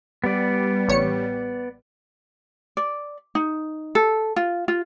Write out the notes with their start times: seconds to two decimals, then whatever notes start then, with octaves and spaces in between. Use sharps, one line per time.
0.24 G3 B3 D5
0.88 A1 C#5 C#7
2.77 D5
3.35 D#4
3.95 A4
4.36 F4
4.68 F4